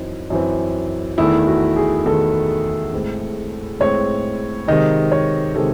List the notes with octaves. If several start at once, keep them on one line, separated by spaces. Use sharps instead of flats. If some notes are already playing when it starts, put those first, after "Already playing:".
Already playing: F#2 E3 C4 D#4
F#2 E3 C4
E2 D#3 A3 E4
F#4
G#4
E2 D#3 A3 A4
A2 G#3 C4
A2 G#3 C4 C#5
C3 D#3 G#3 C4 D#5
C#5
C3 D#3 G#3 C4 A4